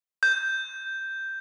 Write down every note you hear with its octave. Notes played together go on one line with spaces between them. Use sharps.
G6